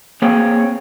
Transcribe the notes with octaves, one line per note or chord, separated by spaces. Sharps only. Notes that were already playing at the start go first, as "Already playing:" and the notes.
A#3 C4 G#4 C#5 G5